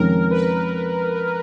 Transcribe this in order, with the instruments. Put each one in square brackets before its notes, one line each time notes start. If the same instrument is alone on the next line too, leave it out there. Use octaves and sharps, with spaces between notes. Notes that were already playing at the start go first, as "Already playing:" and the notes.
Already playing: [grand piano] F2 C3 D#3 G#3 C#4 [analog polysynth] A#4
[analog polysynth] B4